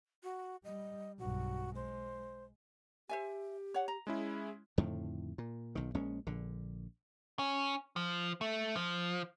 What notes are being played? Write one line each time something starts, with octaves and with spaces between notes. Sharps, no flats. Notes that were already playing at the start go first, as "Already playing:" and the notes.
F#4
G3 D#5
B1 G2 F#4
G#3 C5
G4 C5 E5 G#5
C#5 F#5
A#5
G#3 C#4 E4 G#4
F2 A2 D3 D#3
A#2
B1 D#3
A#1 G#3 C#4
A#1 D3
C#4
F3
A3
F3